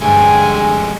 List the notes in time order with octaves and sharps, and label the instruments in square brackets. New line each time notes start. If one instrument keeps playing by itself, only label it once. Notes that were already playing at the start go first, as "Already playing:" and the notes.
[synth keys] D2 G2 [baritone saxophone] G#3 [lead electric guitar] A3 G4 [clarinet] G#5